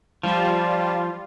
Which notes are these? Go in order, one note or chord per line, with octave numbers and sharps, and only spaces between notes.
F3 G3 F4